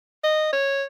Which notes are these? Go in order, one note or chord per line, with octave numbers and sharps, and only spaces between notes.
D#5
C#5